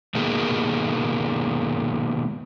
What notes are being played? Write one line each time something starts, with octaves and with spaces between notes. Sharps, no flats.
B2 D#3 G#3 A#3